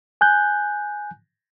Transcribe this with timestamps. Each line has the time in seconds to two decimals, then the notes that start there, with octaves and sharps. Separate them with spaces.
0.21 G#5 F#6 G6